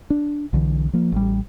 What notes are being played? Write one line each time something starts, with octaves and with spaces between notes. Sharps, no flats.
D4
B1 D3 E3
F3 A#3
A1 G3